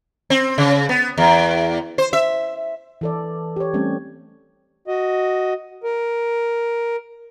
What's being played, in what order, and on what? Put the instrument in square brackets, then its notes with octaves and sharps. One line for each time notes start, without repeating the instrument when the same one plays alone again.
[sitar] C4
C#3
B3
E2
C5
E5
[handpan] E3 A4 D5
G4 C#5
G3 A3 C4 C#4
[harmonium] F#4 D#5
A#4